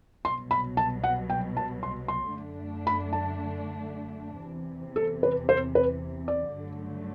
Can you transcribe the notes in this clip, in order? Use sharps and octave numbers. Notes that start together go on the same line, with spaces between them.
C2 B2 F#3 C6
B5
A5
F#5
G5
A5
C6
C6
F#2 D3 A3 D4
B5
A5
E2 C3 E3
A4
B4
C5
B4
D5
G2 D3 F#3 A3